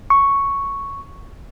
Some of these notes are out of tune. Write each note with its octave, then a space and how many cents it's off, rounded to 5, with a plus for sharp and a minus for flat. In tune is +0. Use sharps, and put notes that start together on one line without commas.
C#6 +0